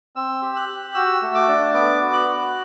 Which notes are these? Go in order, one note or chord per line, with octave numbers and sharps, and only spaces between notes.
C4 E6
G4
F#6
G4
F#4 E6
A3
D6
D4
B3 D6
F#4
F#6
F#4